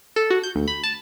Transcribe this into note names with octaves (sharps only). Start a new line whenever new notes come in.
A4
F#4
G6
D2
B5
A5